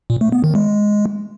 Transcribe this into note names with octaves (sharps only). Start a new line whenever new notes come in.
A#2
A3
B3
D#3
G#3